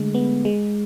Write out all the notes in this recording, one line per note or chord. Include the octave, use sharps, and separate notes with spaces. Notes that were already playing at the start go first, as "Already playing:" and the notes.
Already playing: D3 G#3 A3
B3
G#3